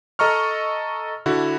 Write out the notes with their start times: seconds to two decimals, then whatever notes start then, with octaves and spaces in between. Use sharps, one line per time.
0.19 A4 D#5 A#5 C#6 F6
1.26 D3 E4 F#4